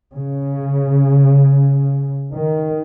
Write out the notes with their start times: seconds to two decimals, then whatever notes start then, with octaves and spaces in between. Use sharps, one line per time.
0.15 C#3
2.32 D#3